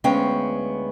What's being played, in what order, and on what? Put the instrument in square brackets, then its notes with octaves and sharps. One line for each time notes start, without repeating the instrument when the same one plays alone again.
[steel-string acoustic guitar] D2 G#3 B3 C#4 F5 G5